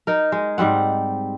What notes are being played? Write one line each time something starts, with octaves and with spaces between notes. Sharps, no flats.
D#4 A#4
G#3
G#2 G3 C4 F#5